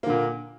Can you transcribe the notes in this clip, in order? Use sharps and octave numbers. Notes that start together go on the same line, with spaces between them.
A#2 D3 A#3